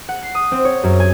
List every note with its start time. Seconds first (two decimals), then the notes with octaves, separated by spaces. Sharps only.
0.09 F#5
0.22 C7
0.35 D#6
0.52 C4
0.65 C#5
0.84 F#2
1.00 G#5